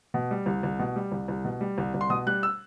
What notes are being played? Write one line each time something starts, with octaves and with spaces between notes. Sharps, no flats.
B2
G3
C2
C2
B2
G3
C2
C2
B2
G3
C2
C2
C6
B2 D#6
G3 F#6
E6